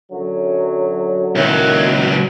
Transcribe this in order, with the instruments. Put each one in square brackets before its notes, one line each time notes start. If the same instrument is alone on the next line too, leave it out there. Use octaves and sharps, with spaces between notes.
[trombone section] F#2 D3 F#3
[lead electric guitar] C#2 F#3 [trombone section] D#3 A#3 E4